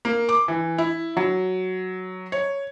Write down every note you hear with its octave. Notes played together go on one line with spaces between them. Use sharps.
A#3
D6
E3
E4
F#3
C#5